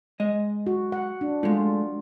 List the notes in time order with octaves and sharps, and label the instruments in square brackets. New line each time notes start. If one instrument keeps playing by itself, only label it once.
[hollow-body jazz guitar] G#3 D#5
[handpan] F#4
F#5
D4
[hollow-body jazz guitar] G#3 A3 [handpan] F4